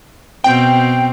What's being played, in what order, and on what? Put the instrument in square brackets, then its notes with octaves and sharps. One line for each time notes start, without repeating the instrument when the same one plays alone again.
[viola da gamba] B2 C4 [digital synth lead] G5